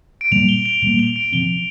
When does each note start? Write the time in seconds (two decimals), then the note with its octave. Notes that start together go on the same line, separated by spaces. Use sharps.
0.21 D7
0.31 A#2 G3 A#3 F7
0.49 G7
0.65 F7
0.82 A#2 G3 A#3 G7
0.99 F7
1.16 D7
1.32 C3 F3 C4 G7